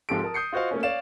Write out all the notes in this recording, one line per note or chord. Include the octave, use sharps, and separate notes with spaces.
G#2 F3 C4 G4 A4 D7
A#4 A5 D#6
D#6 G6 C7 C#7
F4 F#4 C5 D#5 F5
A3 A#3 C#4
C#5 D5 F5 E7